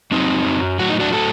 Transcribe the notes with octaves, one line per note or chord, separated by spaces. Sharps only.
F#2 F#3 C4 D#4
F#2 F#3
A2 F#3 F#4
D#4
D4 F#4
A2 F#3 F#4 A4